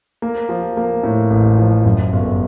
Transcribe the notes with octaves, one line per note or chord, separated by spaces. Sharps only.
A#3
F3
A#3
A2
A1
F3
F#2
G1